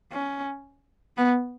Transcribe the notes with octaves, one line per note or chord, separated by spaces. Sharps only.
C#4
B3